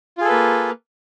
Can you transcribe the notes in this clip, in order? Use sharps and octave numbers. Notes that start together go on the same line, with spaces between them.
A#3 F4 G#4 A4 B4